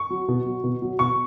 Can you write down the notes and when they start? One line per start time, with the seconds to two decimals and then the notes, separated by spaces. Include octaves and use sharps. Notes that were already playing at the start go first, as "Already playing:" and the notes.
Already playing: C#6
0.10 F#3
0.28 B2
0.46 F#3
0.64 B2
0.82 F#3
0.99 B2 C#6